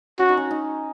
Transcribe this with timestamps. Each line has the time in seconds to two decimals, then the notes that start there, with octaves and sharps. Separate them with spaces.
0.19 C#4 F#4
0.29 D#4
0.37 C#4
0.51 D#4